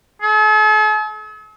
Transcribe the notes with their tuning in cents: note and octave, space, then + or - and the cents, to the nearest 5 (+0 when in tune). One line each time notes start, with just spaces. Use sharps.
A4 -45